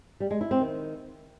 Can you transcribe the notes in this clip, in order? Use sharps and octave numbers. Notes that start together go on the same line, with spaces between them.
G3
G#3
E4
C4
D#3